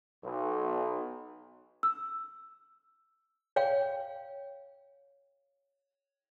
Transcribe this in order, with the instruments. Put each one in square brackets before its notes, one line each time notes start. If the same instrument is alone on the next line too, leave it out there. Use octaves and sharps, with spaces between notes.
[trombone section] B1
[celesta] E6
[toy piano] C#5 F5 G5